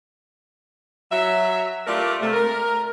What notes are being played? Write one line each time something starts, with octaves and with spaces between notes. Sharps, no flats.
F#3 E5
A3 F4 G4 A#4 D5
C3 A3
A#4